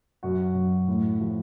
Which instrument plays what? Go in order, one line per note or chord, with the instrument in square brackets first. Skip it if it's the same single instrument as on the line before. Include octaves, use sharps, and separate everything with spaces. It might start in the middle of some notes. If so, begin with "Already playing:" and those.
[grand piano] F#2 F#4
F#2
A2
F3